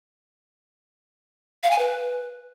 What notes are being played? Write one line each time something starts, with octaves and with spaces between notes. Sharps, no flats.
F5
G#5
B4